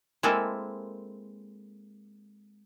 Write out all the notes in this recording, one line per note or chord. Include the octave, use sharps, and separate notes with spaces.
G#3 A#3 C4 E4 G#4 A4